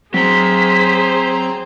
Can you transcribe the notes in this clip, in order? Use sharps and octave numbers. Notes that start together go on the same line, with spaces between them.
F#3 C4 G#4 C5 A#5 C6 B6